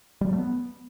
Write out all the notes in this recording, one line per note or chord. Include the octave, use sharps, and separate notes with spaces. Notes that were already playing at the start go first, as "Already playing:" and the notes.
G3
F#3
A3
B3